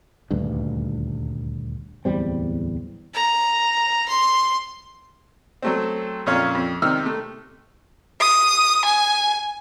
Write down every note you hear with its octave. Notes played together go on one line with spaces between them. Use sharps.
D#1 D2 G2
D1 E2 G3 C4
A#5
C6
F#3 A3 C4
F2 A#2 C#4 C#5 F5
F2
C3 D#3 E6 F6
A3
D#6
G#5